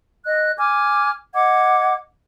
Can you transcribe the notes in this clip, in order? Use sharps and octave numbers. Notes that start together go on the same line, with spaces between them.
D#5 F#6
G#5 D6 F6 G#6
D#5 F#5 D6 G#6